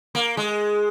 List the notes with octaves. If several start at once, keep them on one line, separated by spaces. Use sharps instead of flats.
A#3
G#3